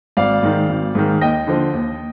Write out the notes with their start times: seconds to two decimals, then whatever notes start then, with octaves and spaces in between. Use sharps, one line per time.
0.17 G#1 D5 F5
0.43 G#2 D#3
0.69 G#1
0.95 G#2 D#3
1.21 D#2 D#5 G5
1.47 D3 F3
1.73 D#2